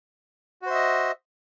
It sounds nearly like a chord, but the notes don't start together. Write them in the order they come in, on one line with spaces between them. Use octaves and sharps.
F#4 C5 E5 D#5